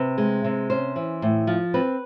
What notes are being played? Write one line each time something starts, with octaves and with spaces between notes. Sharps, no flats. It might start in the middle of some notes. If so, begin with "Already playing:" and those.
Already playing: C3 B4
G#3
C3
C#4 C5
E3
A2
F3
C4 B4